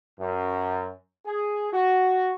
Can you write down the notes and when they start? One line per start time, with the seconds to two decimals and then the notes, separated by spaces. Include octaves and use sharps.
0.19 F#2
1.25 G#4
1.72 F#4